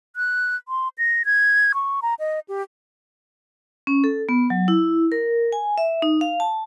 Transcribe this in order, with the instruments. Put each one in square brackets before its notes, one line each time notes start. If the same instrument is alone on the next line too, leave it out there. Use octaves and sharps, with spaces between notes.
[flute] F#6
C6
A#6
G#6
C#6
A#5
D#5
G4
[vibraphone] C#4
A4
B3
F#3
E4
A#4
G#5
E5
D#4
F5
A5